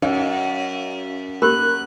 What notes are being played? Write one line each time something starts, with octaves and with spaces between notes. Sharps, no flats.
F#2 C#4 D#5 F5
A#3 G4 A#4 B5 F#6